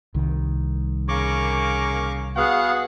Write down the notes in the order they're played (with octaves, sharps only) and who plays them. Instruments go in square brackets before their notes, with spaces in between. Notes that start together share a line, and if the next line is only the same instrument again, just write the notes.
[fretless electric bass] C2 D#3
[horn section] C#3 A#3 [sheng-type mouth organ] C#6 D6
[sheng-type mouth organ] B3 F5 [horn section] F#4 G#4 F#5